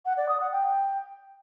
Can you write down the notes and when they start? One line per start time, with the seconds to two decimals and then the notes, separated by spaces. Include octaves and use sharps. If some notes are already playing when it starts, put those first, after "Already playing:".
0.05 F#5
0.17 D5
0.29 D#6
0.40 F#5
0.52 G5